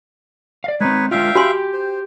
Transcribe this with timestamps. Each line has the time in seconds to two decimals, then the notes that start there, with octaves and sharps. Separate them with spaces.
0.64 D5 F5
0.81 G#3 C4 D#4 B4 C#5
1.11 G#3 D4 F4 E5 F5 G5
1.35 F#4 G4 G#5 C6
1.74 C5